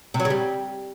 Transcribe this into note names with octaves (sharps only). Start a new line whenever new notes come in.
C3
F#3
C#3
G3